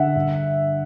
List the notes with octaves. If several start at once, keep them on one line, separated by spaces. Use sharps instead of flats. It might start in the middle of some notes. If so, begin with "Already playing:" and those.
Already playing: D3 E5 F#5
G2